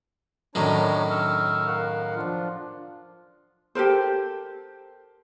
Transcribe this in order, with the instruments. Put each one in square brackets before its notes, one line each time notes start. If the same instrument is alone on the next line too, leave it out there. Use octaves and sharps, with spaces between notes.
[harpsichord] F#2 A2 D#3 [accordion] D4 C#5 A#5
[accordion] C#6 E6 F6
A#4 F5 F#5
F3 D4 F4
[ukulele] G4 A4 A#4 C5